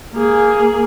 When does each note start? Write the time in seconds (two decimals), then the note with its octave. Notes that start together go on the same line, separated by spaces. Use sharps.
0.13 A#3 G#4